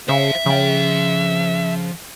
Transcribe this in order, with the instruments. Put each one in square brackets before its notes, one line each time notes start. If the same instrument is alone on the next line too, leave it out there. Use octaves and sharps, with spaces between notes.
[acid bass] C#3 [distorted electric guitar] C5 F5 [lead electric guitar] E5
[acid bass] C#3 [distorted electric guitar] F3 G5